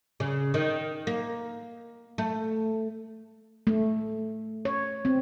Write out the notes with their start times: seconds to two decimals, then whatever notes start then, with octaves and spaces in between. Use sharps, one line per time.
0.20 C#3
0.54 D#3
1.07 A#3
2.18 A3
3.67 A3
4.65 C#5
5.05 C4